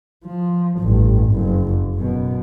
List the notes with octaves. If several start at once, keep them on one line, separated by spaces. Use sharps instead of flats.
F3
A1 G2
F#1 F2
F#2 B2